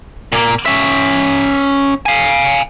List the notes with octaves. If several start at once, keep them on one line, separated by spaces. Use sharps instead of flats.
A#2 A#3
C#4 E5
F5 G#5